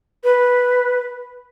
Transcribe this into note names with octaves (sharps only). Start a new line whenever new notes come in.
B4